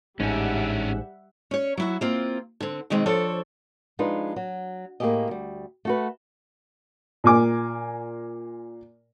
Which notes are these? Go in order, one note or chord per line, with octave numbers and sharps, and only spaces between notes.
A1 G#2 G3 C#4 D4 E5 F#5
C#4 C#5
F#3 E4 F#4
A#3 C4 F4
D3 C4
B2 D#3 G#3 C4
F3 D4 A4 C5 C#5
F3 G#3 D4 D#4 F4 B4
F#3
A2 A#3 E4 G4 G#4 D#5
D2 G3
A3 F#4 B4
A#2 A#3 G#5 D6